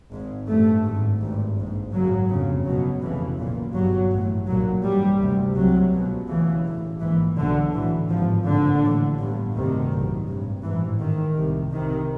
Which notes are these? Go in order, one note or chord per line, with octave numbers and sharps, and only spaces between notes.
G#1 G#2
A1 G2 A3
G#1 G#2
G#1 G2
A#1 G#2
G#1 F#2 C#3 F#3
G1 F2 C#3
C#2 B2 F#3
F1 F2 C#3 E3
B1 A#2
G1 G2 F#3
A1 A2
B1 A#2 F#3
A1 G2 G3
D2 C3
C2 C3 F#3
C#2 B2
D2 C#3 E3
A1 A2
A#1 G#2 E3
B1 B2 D3
B1 A2 E3
G#1 G2 F3
A#1 A2 D3
A1 A2
G1 G2
D2 C3 D#3
B1 A2
G#1 G2
A1 G#2 E3
A1 A2 D#3
C2 C3
C2 C3 D#3